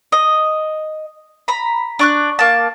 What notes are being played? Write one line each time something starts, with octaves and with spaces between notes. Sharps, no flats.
D#5
A#5 B5
D4 C#6 F#6
A#3 A5